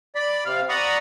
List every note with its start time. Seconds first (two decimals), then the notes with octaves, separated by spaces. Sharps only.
0.15 D5 B5
0.45 C3 F5
0.69 D5 F#5 A#5 B5 C#6 D#6